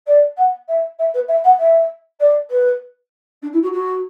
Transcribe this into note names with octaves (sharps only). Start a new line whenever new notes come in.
D5
F#5
E5
E5
B4
E5
F#5
E5
D5
B4
D4
E4
F#4
F#4